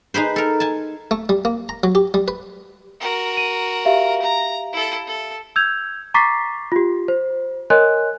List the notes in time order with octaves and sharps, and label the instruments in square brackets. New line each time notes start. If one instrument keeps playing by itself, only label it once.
[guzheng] D#4 G#4 B4 C5
A4 A#4
G#5 A5
[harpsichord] A3
G3
A#3
A#5
F#3
G4
G3
B4
[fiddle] F#4 A#4
[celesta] D#7
G4 E5 F5
[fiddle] A#5
E4 A4
A4
[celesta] E6 G6 G#6 F7
A#5 C#6 D6 A6 B6 C7
F4 G4
C5
A#4 C#5 D#5 G#5 C6 F#6